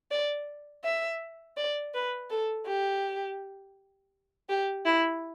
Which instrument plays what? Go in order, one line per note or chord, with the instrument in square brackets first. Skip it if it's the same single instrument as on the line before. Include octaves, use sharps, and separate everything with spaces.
[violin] D5
E5
D5
B4
A4
G4
G4
E4